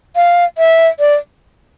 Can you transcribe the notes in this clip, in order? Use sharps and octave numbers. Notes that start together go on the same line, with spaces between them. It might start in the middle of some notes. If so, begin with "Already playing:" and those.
F5
E5
D5